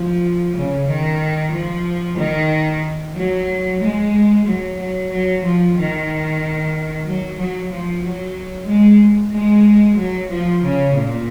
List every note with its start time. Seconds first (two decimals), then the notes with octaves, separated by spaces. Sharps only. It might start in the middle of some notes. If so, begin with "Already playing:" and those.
Already playing: F3
0.55 C#3
0.88 D#3
1.53 F3
2.18 D#3
3.15 F#3
3.81 G#3
4.45 F#3
4.78 F#3
5.11 F#3
5.44 F3
5.77 D#3
7.06 F#3
7.38 F#3
7.72 F3
8.04 F#3
8.69 G#3
9.34 G#3
9.99 F#3
10.32 F3
10.64 C#3
10.97 A#2